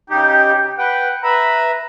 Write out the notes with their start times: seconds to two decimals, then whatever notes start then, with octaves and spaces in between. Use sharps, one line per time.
0.10 C#3 D#4 G4 G5
0.78 B4 F#5 G5
1.23 B4 E5 A#5 B5